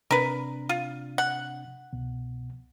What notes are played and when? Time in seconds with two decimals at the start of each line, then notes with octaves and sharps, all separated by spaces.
0.11 C3 D4 A#4 B4
0.69 F4
1.18 F#5
1.93 C2 B2